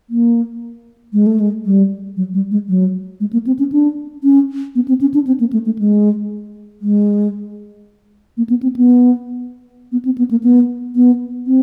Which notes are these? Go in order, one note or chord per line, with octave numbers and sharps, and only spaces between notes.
A#3
G#3
A3
G#3
G3
F#3
G3
G#3
F#3
G#3
A#3
C4
C#4
D4
C#4
B3
C4
C#4
D4
C4
A#3
A3
A3
G#3
G#3
A#3
B3
C4
B3
B3
C4
B3
A#3
B3
B3
C4